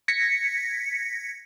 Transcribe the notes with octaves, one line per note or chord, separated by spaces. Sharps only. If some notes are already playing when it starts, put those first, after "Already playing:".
G#6 A#6 B6 C#7